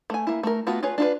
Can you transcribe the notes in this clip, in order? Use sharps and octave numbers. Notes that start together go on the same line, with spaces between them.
A3 G#5
A#3 E4
A3 A#4
A3 B3 F4 F#4
F4 G#4 B4 C#5
D4 F4 B4